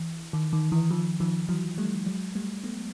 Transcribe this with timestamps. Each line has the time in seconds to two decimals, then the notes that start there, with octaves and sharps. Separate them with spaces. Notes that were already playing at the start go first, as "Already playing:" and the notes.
Already playing: E3
0.33 D#3
0.53 D#3
0.72 E3
0.91 D#3 F3
1.20 D#3 F3
1.49 E3 F#3
1.78 G3 A3
2.06 F#3 G#3
2.35 G3 A3
2.64 A3 B3